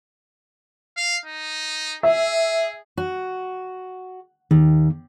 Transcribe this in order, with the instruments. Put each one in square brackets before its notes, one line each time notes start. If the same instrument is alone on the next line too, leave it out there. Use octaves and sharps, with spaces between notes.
[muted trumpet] F5
D#4
[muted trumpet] G#4 [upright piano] E5
[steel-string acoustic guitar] F#4
[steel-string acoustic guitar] D#2 [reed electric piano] D#3